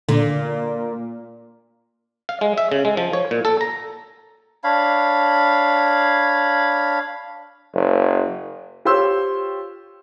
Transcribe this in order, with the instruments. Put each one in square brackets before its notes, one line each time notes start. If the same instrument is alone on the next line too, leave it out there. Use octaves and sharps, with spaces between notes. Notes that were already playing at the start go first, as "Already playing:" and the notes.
[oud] A#2 [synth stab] D3
[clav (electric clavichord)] F5
G#3
E5
C#3
G#3
F3
C#5
A#2
A4
A#5
[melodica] D4 C#5 F5 B5
[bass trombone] F#1
[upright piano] F4 G4 C5 C#5 C6 E6